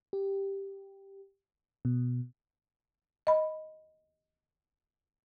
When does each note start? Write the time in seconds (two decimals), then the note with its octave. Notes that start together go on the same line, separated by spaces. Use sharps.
0.13 G4
1.85 B2
3.27 D#5 B5